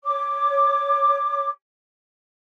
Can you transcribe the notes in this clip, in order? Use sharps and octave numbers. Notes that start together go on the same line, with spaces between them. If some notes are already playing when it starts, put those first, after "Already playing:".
C#5 D6